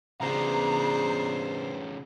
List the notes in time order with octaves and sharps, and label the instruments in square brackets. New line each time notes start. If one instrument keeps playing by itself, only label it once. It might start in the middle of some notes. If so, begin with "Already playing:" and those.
[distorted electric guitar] C#3 B3 [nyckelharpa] D4 G#4 [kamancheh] C5 [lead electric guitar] A#5